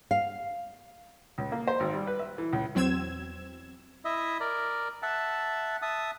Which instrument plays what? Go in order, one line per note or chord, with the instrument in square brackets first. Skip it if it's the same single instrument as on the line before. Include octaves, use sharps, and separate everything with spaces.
[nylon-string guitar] F5
[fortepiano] C#2
A#3
C5
G#1
G3
B4
E5
E3
C#2
[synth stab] E2 F#3 C4 E6 G#6 E7
[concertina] E4 D#5 E5
A#4 D5
E5 F#5 A5
E5 A5 D#6